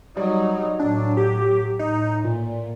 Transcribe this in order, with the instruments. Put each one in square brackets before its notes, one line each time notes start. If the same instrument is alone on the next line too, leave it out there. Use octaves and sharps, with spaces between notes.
[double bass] F#3 D#4 [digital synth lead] G3
[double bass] A2 F#3 [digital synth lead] D4
[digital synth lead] G4
[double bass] A2 [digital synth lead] D#4
[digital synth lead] A#2